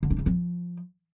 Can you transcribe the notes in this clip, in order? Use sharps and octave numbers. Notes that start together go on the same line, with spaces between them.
D3
D4
C#3
F3